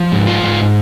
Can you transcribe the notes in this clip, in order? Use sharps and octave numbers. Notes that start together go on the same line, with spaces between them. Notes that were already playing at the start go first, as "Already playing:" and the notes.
Already playing: F3
G#2
F4
G#2